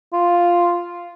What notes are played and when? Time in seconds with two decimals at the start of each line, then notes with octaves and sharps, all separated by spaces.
0.13 F4